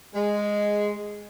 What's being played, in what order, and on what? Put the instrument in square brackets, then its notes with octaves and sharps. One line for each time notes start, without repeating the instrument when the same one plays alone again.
[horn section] G#3